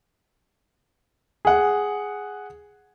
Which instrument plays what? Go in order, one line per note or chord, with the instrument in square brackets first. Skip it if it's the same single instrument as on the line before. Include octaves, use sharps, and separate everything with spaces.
[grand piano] G#4 F#5